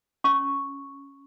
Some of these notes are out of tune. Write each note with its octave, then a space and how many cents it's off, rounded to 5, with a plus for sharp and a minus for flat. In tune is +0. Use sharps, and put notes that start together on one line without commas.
C#4 +0 C#6 +0